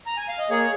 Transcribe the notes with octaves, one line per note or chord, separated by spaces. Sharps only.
A#5
G#5
F5
D#5
A#3 G#4 C#5